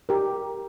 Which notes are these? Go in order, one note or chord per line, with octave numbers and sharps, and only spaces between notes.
G4 A#4